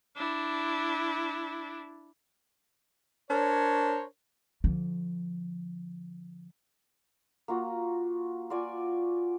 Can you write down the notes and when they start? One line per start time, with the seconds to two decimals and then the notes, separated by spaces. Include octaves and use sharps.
0.17 D4 E4
3.30 D4 A#4 C5 C#5
4.64 D3 F3
7.48 A#3 F4 F#4
8.50 F4 F#4 D5 G#5